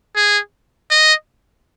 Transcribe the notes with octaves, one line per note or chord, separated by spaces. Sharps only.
G#4
D#5